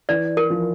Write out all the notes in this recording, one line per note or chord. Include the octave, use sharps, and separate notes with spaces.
E3 D5
A#4
F3